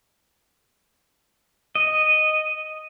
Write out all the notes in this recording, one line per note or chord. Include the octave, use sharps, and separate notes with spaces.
D#5